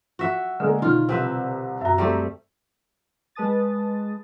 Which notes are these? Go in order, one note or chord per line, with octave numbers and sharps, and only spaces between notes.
F#4 E5
D3 G#3 A#3 A#4
B2 D#3 F4 F6
C2 C4 B4 E5
F#2 F#4 E5 A#5
G3 A3 C4
G#3 B4 A5 D#6 A6